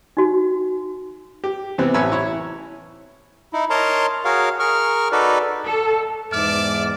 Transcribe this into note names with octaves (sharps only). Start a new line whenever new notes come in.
D#4 F#4
G4
C3 E3 B3 C4
A1 C#5 G#5 B5 E6
E4 C#5
D#4 E4
A#4 C#5 D#5 A5 A#5 C6
F#4 G#4 A#4 C#5 F5
G#4 A#4 C#6 F6
D#4 F#4 A4 B4 D5
A4
E2 G#2 D5 E5 D6 F6